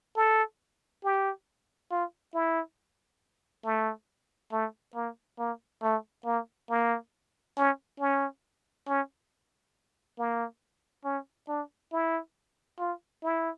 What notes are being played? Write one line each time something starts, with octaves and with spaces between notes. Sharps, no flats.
A4
G4
F4
E4
A3
A3
A#3
A#3
A3
A#3
A#3
C#4
C#4
C#4
A#3
C#4
D4
E4
F4
E4